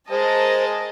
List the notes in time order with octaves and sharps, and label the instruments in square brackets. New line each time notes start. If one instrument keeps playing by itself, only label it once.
[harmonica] G#3 G#5 [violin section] A#4 D#5 A5 [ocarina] C5